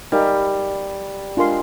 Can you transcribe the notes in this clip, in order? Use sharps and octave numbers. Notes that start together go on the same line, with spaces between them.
G3 D#4 A#4 F5 G#5
G#3 D4 F4 A#4 F5 C6